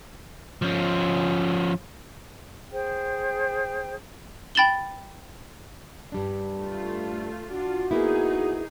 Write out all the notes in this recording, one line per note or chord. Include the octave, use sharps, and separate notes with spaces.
F3 C#4
G#4 C5 G5
G5 B5 A6 E7 F#7 G7
G2 G3 D4
A3 F4
D4 F4 F#4
A#3 B3 D#4 E4 G#4